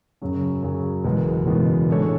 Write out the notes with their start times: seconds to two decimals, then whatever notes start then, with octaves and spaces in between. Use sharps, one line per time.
0.21 F#2 C#3 F#3 C#4 G#4
0.63 F#2 C#3 F#3 C#4 G#4
1.04 F#1 E2 B2 G#3 B3
1.47 F#1 E2 B2 G#3 B3
1.88 A2 G#3 D4 A4 C#5